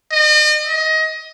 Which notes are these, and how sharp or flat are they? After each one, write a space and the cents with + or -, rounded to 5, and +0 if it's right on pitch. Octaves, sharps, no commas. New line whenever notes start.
D#5 -40
D#5 +25